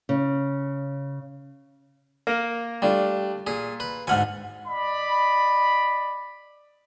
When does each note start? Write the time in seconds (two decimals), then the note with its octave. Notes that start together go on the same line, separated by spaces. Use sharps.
0.09 C#3
2.27 A#3 A#4
2.82 G3 A3 D4 F4
3.47 A#2 G#4
3.80 B4
4.07 D2 G#2 F#5 G#5 F6
4.67 D5 D#5 B5